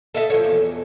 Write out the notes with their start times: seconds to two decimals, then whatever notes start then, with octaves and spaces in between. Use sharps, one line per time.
0.14 A4 D#5 E5
0.30 F3 C#5
0.44 E2